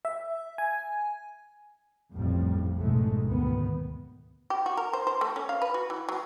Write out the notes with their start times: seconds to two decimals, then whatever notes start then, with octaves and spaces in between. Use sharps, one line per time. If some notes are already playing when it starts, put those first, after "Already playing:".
0.05 E5
0.58 G#5
2.12 A1 F2 A2 G3
2.77 F#1 B1 G#2 G#3 A3
3.24 D2 G#2 D#3 B3
4.50 G4
4.66 F#4
4.77 A#4
4.93 C5
5.07 C5
5.21 A3
5.36 C#4
5.49 F5
5.62 B4
5.74 F#4
5.90 E3
6.09 F#3